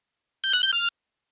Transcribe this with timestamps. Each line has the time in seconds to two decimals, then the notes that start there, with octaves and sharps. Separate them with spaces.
0.44 G6
0.53 F#6
0.63 G6
0.73 F6